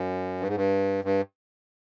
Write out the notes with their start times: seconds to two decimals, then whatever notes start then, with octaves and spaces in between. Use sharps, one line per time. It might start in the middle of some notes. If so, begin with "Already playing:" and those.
Already playing: F#2
0.41 G2
0.48 G#2
0.56 G2
1.05 G2